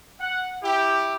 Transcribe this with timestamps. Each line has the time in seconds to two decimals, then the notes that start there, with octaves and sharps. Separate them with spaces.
0.20 F#5
0.63 E4 G4